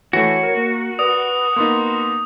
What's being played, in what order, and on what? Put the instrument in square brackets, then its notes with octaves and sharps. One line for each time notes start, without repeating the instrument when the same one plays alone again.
[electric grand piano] E3 A3 [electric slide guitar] F#4 [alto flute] C#5
[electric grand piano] A#4
[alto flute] A#3
[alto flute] B4 [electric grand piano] D5 [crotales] D#6
[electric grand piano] A#3 B3 D#4 [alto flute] C6